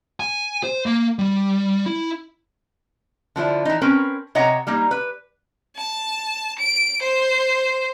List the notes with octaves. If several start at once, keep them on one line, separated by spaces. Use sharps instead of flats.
G#5
C5
A#3
G3
E4
D3 F3 D4 E4
E3 D#4
C4 C#4 A#4 B4
C3 C#5 D#5 F#5 A#5
G3 A#3 D#4
B4
A5
D7
C5